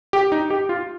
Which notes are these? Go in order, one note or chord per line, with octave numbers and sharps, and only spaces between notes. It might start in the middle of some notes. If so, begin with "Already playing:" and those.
G4
D#4
G4
F4